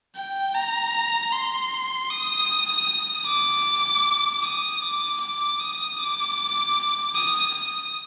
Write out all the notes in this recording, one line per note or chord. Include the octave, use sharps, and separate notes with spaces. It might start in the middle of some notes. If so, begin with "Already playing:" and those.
G5
A#5
C6
D#6
D6
D#6
D6
D6
D#6
D6
D#6
D#6